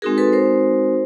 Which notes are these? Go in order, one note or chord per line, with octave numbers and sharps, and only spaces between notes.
G#3 C4 D#4 F#4 G#4 A#4
A4 B4
A#4 C5